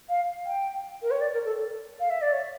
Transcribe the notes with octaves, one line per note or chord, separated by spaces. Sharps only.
F5
G5
A#4
C#5
D5
A#4
A4
F5
E5
D5
C#5